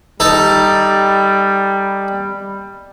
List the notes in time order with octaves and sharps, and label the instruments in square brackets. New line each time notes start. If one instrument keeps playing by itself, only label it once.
[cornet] G3 [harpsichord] D#4 A4